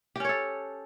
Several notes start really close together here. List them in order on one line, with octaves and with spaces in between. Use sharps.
G4 C#4 C#5 A4